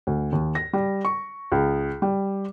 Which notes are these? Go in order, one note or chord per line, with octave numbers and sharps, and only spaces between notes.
D2
D#2
A#6
G3
C#6
C#2
G3